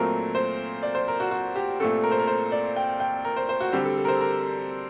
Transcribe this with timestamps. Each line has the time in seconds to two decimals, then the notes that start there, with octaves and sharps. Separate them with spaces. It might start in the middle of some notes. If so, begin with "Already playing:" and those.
Already playing: A#2 F#3 A3 C4 A#4
0.35 C5
0.83 D5
0.95 C5
1.08 A#4
1.20 F#4
1.31 F#4
1.56 G4
1.80 A#2 A3 C4 A4
2.03 A#4
2.12 C5
2.19 A#4
2.27 C5
2.52 D5
2.76 G5
3.00 G5
3.25 A#4
3.36 C5
3.49 C5
3.60 F#4
3.73 D3 G3 C4 G4
3.85 A4
3.97 A4
4.05 A#4
4.08 C5
4.21 A#4